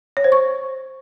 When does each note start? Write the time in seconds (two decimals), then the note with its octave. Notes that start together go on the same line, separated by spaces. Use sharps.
0.17 C#5
0.24 C5
0.32 C#6